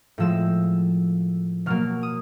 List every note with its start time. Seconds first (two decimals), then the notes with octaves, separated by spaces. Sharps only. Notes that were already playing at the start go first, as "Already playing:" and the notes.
0.18 A2 F3 G#3 E6
1.66 B2 F#3 A#3 F6
2.03 D#6